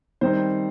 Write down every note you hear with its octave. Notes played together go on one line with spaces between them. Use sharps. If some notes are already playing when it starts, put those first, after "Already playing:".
D#3 G3 C4 D#4 C5